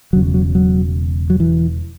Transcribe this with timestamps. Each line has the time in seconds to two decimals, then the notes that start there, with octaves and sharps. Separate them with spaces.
0.13 E1 E2 C#3 F#3
0.34 F#3
0.55 F#3
1.30 F#3
1.40 E3